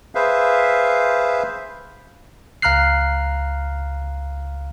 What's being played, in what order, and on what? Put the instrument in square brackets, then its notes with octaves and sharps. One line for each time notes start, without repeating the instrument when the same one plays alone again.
[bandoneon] G#4 B4 C5 E5 F5
[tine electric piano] C#2 F5 A#5 F6 F#6 C7